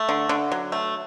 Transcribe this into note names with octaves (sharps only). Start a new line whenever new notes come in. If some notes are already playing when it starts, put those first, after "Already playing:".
Already playing: A3
D3
D3
F#3
A3